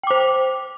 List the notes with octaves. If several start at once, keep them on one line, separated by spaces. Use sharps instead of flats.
C5 G5 D6